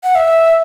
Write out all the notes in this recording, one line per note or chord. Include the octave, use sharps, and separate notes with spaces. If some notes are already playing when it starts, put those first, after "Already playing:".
F#5
E5